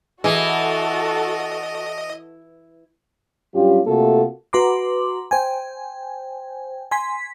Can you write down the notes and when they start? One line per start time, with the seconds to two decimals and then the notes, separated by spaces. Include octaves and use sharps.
0.24 E3 E4 F#4 G#4 A4 D#5
3.54 G2 F#3 C#4 F4 G4
3.86 C3 A3 A#3 F4 F#4 A4
4.53 F#4 B4 A#5 C6 D6
5.31 C5 G5 G#5
6.91 G#5 C6 B6